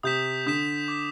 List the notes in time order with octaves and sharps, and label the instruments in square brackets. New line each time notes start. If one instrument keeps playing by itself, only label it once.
[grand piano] C3 [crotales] D#6 G6 B6 E7
[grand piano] D3 [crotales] D#6 G6 B6 E7
[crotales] D6 G6 B6